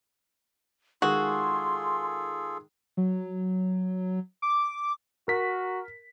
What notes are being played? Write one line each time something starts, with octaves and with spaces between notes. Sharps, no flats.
D#3 G#3 F4 F#4 G#4 A4 C6
F#3
D6
F#4 A#4 B6